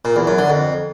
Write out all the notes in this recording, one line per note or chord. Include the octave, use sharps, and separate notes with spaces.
A#2
E2
F#2
D3
F2